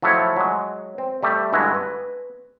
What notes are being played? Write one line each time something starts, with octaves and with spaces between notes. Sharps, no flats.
F3 F#3 A3 E4 C#5
F#3 G#3
C4
G3 A3 G4
G2 D3 G#3 E4 F#4
B4